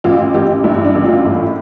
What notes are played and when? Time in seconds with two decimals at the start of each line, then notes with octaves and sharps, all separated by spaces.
0.04 A1 F4
0.34 A1 G4
0.64 G2 E4
0.85 D4
0.95 A1
1.04 F4
1.25 A2